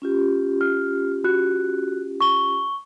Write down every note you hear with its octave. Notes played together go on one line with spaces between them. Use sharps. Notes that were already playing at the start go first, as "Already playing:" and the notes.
C#4 F4 G4
F6
F#4 F#6
C#6 G7